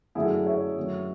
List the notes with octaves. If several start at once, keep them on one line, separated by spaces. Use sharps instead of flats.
F#2 D3 A3 E4 G#4
C#5 E5
F#2 D3 A3